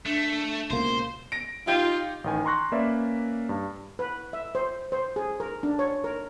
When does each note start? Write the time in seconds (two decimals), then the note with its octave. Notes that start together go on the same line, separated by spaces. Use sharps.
0.06 A3 D4
0.70 C#2 B2 A#3 C5
1.32 A#6 D7
1.67 D#4 F4 G4 G6
2.24 A1 D#3 G#5
2.45 A#5 C6 C#6 F#6 A#6
2.72 A#3 C#4 B4 D5 E5
3.49 G2
3.99 B4
4.33 E5
4.55 C5
4.92 C5
5.16 G#4
5.40 A#4
5.63 D4
5.79 C#5
6.04 A#4